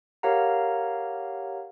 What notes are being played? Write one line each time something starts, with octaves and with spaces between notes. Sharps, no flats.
G4 A#4 C#5 F5 F#5 A#5